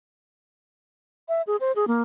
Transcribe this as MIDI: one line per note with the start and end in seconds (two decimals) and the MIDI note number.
1.28 1.42 76
1.47 1.56 68
1.60 1.72 72
1.76 1.85 68
1.87 2.02 58